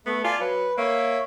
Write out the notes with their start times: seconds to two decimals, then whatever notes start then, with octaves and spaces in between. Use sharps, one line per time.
0.06 A3 B3
0.24 F4 D5 G#5 A5
0.41 F#3 B4
0.78 A#3 C#5 E5